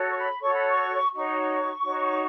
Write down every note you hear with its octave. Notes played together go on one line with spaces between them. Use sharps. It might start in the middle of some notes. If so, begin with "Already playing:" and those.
Already playing: F#4 A4 C#5
C#6
B5
F#4 A4 C#5 C#6
B5
C#6
D#4 F#4 C#5 C#6
D#4 F#4 C#5